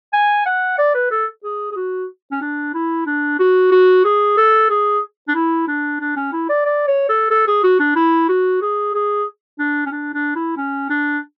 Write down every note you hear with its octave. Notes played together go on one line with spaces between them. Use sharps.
G#5
F#5
D5
B4
A4
G#4
G#4
F#4
C#4
D4
E4
D4
F#4
F#4
G#4
A4
G#4
D4
E4
D4
D4
C#4
E4
D5
D5
C#5
A4
A4
G#4
F#4
D4
E4
F#4
G#4
G#4
D4
C#4
D4
D4
E4
C#4
D4